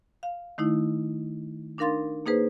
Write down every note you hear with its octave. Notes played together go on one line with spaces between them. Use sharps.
F5
D#3 A3 D#4 E4
D4 D#4 A#4 F5 C6 A6
A#3 D#4 G#4 B4 C5